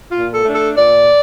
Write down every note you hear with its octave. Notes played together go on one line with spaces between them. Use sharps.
A#2 F4
A4
A3 D4
A4
A#2 D5